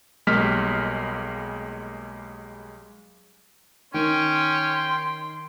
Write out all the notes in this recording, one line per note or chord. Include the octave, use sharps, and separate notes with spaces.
B1 G3 G#3 A#3 F6 B6
D#3 C#4 G5 C6